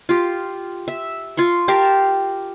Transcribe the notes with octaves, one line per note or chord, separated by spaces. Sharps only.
F4 G4
E5
F4 C6 C#6
G4 A#4 F5 A5